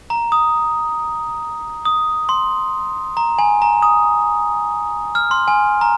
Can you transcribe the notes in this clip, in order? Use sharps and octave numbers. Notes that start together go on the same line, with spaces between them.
A#5
D#6
D#6
C6
A#5
G#5
A#5
D#6
F6
C6
G#5
A#5